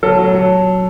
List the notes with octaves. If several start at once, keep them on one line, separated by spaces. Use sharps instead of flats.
F#3 A4
F#3
F#3